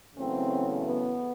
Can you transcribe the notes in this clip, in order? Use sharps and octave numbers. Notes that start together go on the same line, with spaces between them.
E2 C#3 F#3 A3 C4
B3